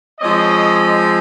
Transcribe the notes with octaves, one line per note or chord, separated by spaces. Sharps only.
F3 G#3 C4 C#5 D#5